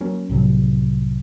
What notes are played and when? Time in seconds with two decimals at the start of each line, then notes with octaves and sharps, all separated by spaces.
0.01 F#3 A#3 C#4
0.29 C2 A2 C3 F#3